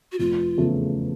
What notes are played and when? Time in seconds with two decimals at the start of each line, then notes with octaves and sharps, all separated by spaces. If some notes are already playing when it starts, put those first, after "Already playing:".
0.12 F#4
0.19 F1 F4
0.58 E2 C#3 F3 A3